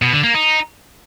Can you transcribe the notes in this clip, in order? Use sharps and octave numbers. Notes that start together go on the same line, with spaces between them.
B2
D3
A#3
D#4